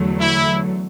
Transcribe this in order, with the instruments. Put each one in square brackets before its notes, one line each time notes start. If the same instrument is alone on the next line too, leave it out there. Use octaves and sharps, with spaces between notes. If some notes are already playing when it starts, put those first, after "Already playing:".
Already playing: [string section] E2 D3 F#3 A3
[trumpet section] E4